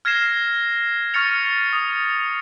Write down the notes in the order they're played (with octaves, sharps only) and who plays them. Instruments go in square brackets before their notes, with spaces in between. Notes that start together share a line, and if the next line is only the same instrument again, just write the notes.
[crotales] F6 G#6 A#6 C7 E7
C#6 F6 A6 C#7 F7
D#6